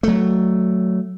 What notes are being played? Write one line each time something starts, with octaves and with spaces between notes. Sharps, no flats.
F#3 A3